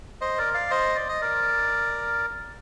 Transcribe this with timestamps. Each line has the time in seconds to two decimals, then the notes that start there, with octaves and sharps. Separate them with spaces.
0.21 C5 D#5
0.38 A#4 D5
0.54 D5 F5
0.70 C5 D#5
0.95 D5
1.09 D#5
1.21 A#4 D5